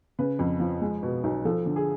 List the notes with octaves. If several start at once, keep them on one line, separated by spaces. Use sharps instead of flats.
C#3 B4
F2
F3
G#3
B2
B1
F3 A4
D3
G#4